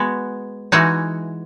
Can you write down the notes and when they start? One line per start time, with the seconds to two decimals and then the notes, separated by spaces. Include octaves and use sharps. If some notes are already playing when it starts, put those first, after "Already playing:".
Already playing: G#3 B3 F#4
0.72 E3 G#3 D#4 F#4